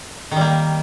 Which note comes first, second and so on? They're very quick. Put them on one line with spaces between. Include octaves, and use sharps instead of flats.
D#3 G3 A#3